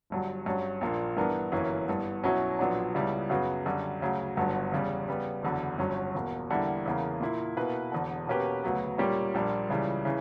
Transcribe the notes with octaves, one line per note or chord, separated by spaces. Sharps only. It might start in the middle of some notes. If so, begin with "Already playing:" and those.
G1 G2 F#3
G2 F#3 C#4
A#1 A#2 A#3 D4
G2 E3 B3 D4 A#4
G1 F#2 E3 A#3 C#4
G2 E3 B3
B1 B2 F#3 C#4 E4
A#1 A#2 F#3 B3 D4
C#2 C#3 G3 B3 E4
F#2 C#3 F#3 B3 F#4
F#2 D3 G3
D2 C#3 F#3
G1 G2 D3 F#3 B3
E2 C#3 G3
C#3 G3 B3
F#1 E2 D3 F#3
G1 G2 F#3 C#4
E2 B2 A#3
E2 D3 G3 A#3 E4
E2 C#3 E3 A#3
A#2 A#3 E4
B2 A#3 E4 B4
E1 E2 D3
B2 A#3 C#4 G4 B4
D2 C#3 F#3 B3
A#2 G3 A#3 C#4 G4
A#1 A#2 G3 A#3 D4
C#2 C#3 E3 G3
C#3 E3